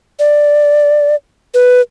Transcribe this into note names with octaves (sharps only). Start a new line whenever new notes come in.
D5
B4